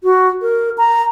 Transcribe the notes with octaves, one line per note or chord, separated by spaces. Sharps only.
F#4
A#4
A#5